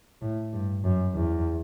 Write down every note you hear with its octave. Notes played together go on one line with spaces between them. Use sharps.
A2
G2
F#2
E2